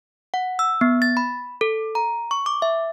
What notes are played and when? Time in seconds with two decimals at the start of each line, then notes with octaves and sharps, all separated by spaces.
0.34 F#5
0.59 E6
0.81 B3
1.02 A6
1.17 B5
1.61 A4
1.95 A#5
2.31 C#6
2.46 D6
2.62 E5